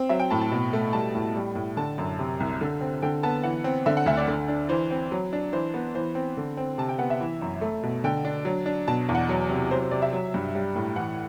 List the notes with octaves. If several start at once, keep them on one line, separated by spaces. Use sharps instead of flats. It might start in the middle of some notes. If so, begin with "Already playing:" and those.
Already playing: C4
F#3 E5
G5
A2 A5
A5
B2
A3
G3 A5
A2
G3
A2
D3 A5
F#2
C3
C2
D3
C4
D3 G5
B3 A5
E3 F#5
C4
D3 E5
F#5
D2 E5
D5
D3
D4
E3 C5
C4
F#3
D4
E3 C5
B3
E3 C5
C4
D3
C4
C3 A5
G5
B3 F#5
E5
E3
F#2
A3
B2
D3 G5
D4
F#3
D4
B2 A5
E2
F#5
F#3
C3
F#3 C5
C5
C3 D5
E5
F#3
G2
G3
A2
E3 F#5